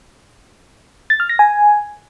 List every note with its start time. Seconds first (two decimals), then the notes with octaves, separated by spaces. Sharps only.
1.10 A6
1.20 F6
1.29 A#6
1.39 G#5